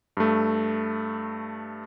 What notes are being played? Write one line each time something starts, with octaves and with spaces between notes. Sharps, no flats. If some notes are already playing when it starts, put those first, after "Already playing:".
G2 A3